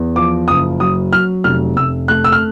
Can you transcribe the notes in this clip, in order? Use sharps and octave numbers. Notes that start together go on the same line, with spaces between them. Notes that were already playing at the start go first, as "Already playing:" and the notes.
Already playing: E2
F3 D6
F#1 D#6
F#3 D#6
F#3 F6
F1 F6
F1 E6
A3 F#6
E6
F6